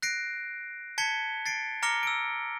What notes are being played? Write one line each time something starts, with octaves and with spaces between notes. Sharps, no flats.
F#6 A#6 C7 D7
A5 G#6 B6 C#7 G7
A6 C7 D7
A#5 D6 F6 A#6 C#7 G7
E6 D7